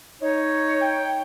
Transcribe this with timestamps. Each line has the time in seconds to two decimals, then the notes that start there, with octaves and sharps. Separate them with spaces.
0.22 D#4 C#5
0.82 G5